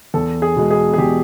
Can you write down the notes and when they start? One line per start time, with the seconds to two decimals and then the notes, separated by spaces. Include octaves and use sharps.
0.14 E2 A4
0.42 G#4
0.56 B2 G#3
0.71 G#4
0.94 G#4
0.98 E2 G4